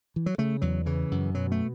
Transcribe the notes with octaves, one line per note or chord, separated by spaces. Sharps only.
E3
F#3
C#3 A3
E2 F#3
C#3 E3
F#2
B2 F#3
A3